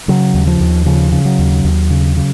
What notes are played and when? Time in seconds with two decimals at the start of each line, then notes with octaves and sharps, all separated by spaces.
0.08 C#3 F#3
0.34 D#2
0.47 F3
0.60 D#2
0.86 C#3 F3
1.12 C#3
1.25 F#3
1.39 D#2
1.64 D#2
1.90 C#3
2.17 C#3